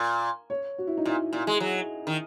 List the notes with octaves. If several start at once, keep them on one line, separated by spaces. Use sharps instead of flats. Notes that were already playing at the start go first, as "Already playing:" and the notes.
Already playing: A#2
C#5
F#4
E4
D#4
A#2 E4
A#2
G#3
F#3
D#3